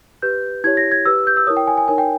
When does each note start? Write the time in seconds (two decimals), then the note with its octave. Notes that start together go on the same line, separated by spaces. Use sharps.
0.22 G4 B4 G6
0.64 E4 G4 C#5 G#6
0.77 A#6
0.92 G#6
1.05 G4 B4 E6
1.27 G6
1.37 E6
1.47 E4 A#4 C#5 D#6
1.57 G5
1.67 G#5
1.78 G#5
1.88 D#4 A#4 C#5 G#5
1.98 G5